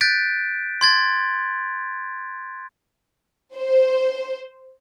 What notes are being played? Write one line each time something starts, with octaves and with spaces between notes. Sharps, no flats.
F#6 G6 A6 B6 D7
C6 G#6 A6
C5